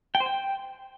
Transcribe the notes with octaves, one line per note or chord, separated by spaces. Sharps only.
G5
C5
G5